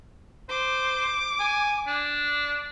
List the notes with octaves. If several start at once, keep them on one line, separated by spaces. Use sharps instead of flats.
C5 D6
G#5
D4